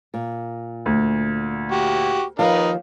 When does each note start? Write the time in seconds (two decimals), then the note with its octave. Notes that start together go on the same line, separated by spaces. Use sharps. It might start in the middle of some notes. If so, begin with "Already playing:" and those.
0.14 A#2
0.86 D2
1.71 F#4 G4
2.39 D#2 F3 D#4 A#4 B4 F5